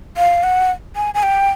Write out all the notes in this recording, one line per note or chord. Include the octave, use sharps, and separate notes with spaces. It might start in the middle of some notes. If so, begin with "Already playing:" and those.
F5
F#5
G#5
G#5
G5